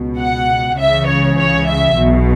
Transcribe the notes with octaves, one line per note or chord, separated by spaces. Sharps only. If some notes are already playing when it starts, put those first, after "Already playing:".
Already playing: C#2 B2
F#5
C#2 C#3 E3 E5
C#5
C#5
E5
B1 B2